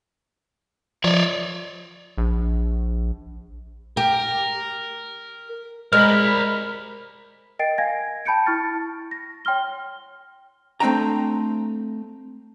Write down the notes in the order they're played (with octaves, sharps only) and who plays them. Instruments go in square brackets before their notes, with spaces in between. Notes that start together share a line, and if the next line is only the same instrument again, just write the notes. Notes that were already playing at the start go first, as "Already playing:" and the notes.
[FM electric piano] F3 [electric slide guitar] C#5 D5
[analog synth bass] A#1
[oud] G4 [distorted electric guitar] A#4
[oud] G#3 [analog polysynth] A#4 B5 [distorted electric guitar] C5 D5 [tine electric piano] F6
[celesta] A#4 D#5 G5 A6 C7 D7
F5 G#5 G#6 A#6
G5 A5 B5 G6 C#7 D7
E4 C#6 F6 A6
A#6
C#5 G5 C6 F6 G7
[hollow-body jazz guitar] A3 C4 D4 G5 A#5